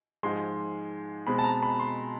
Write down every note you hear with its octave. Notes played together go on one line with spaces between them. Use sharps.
G#2 F3 G#3 C6
B2 G#3 C4 B5
A5
A#5
B5
C6